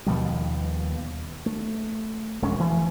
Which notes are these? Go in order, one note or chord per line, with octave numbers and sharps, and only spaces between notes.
D#2 B2 F3 G3
A3
E1 F2 G#3 C#4
E3 F3 A3